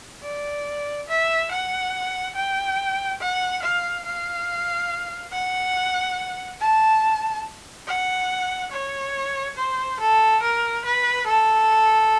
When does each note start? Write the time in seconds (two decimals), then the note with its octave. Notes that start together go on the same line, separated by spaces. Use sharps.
0.23 D5
1.08 E5
1.51 F#5
2.36 G5
3.21 F#5
3.63 F5
4.05 F5
5.32 F#5
6.61 A5
7.88 F#5
8.72 C#5
9.57 C5
10.00 A4
10.43 A#4
10.85 B4
11.27 A4